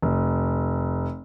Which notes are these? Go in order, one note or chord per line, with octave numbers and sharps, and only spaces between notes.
F1